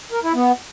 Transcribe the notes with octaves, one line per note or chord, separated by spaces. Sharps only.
A#4
E4
B3